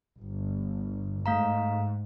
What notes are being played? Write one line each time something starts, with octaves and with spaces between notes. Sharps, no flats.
G1
G#2 A3 F5 A#5